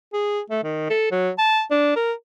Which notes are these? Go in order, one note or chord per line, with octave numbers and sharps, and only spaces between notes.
G#4
A3
D#3
A4
F#3
A5
D4
A#4